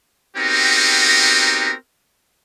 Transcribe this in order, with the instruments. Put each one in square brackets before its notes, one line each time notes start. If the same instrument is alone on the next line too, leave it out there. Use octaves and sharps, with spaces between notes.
[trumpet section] B3 C4 D#4 F#4 G4 A#4